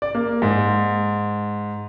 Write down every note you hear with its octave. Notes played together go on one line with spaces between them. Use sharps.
D5
A#3
G#2